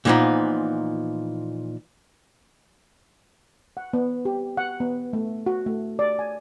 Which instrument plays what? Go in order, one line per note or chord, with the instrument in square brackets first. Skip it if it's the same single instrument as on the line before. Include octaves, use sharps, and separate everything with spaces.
[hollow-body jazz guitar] A#2 E3 F3 B3 D#4
[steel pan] F#5
B3
G4
F#5
B3
A3
F#4
A3
D5
G#5